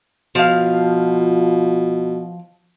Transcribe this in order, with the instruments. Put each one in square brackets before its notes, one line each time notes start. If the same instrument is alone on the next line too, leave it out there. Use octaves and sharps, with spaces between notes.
[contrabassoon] B2 [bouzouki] F3 F5